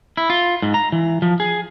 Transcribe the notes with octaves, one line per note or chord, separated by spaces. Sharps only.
E4
F4
G#2
A#5
E3
F3
G#4